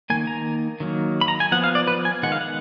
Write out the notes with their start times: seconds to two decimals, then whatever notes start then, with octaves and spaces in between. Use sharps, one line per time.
0.10 D#3 A#3 G#5
0.27 A#5
0.80 D#3 F#3 A#3
1.21 B5
1.28 A#5
1.40 G#5
1.52 F3 B3 F#5
1.64 F5
1.75 D5
1.87 B4
2.05 G#5
2.23 D#3 G#3 B3 F#5
2.32 F5
2.41 F#5